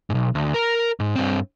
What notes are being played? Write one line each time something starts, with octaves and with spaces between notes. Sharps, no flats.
B1 G#2
D2
A#4 A#5
G#2
G2 C4